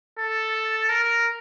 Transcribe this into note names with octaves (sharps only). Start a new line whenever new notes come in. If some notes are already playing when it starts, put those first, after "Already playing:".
A4
A#4